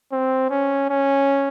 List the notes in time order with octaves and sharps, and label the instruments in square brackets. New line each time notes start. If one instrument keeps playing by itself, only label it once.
[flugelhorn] C4
C#4
C#4